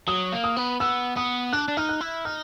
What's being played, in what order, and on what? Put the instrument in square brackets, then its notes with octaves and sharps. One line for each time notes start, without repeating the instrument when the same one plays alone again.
[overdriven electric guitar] F#3 [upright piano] D#6
[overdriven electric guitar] A#3
[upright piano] D#6
[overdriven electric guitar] B3
[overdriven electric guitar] B3 [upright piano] E6
[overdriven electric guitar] B3 [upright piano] D#6
[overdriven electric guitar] D4 [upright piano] F#6
[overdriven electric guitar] D4
[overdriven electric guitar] D#4 [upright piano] F6
[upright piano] F#6
[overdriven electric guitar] E4
[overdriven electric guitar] D#4 [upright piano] F6